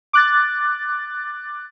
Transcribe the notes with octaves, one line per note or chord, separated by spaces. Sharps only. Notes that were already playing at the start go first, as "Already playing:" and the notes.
D6 F#6 A6